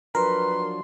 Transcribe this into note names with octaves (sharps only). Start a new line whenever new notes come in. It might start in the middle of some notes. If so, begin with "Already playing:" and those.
F3 F#3 D4 A#4 B4 C6